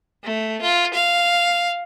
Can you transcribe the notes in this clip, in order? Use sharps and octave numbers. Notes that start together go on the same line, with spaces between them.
A3
F4
F5